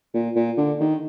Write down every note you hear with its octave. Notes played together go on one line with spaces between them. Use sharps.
A#2
A#2
D3
D#3